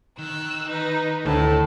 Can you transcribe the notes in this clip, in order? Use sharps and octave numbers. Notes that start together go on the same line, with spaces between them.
D#3 E6 F#6
D#4 B4
D2 A2 A5